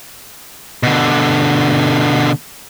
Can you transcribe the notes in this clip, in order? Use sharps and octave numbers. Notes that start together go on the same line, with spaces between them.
B2 D3